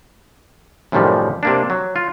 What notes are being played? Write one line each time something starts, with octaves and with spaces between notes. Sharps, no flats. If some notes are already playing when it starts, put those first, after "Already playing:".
F#2 A2 C3 D#3 F3 G3
C3 A#3 D4
F#3
F4